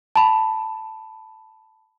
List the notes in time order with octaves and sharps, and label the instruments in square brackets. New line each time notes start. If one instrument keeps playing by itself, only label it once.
[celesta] A5 B5